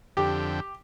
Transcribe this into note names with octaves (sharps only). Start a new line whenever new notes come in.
F2 D3 G4 G5